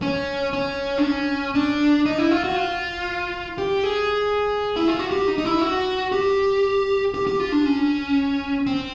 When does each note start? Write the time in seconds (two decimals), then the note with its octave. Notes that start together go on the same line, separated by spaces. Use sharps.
0.02 C#4
0.53 C#4
0.98 D4
1.04 C#4
1.55 D4
2.06 D#4
2.18 E4
2.31 F4
2.44 F#4
2.56 F4
3.58 G4
3.84 G#4
4.76 E4
4.88 F4
4.99 F#4
5.11 G4
5.28 D#4
5.38 D#4
5.45 E4
5.61 F#4
6.12 G4
7.14 G4
7.27 G4
7.40 F4
7.52 D4
7.65 C#4
8.67 C4